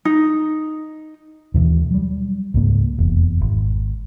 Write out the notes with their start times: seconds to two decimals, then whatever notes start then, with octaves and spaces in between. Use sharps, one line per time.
0.05 D#4
1.54 D#2 B2 E3
1.91 F#3 G3
2.54 C#2 G#2 A#3
2.98 F1 E2
3.41 G#1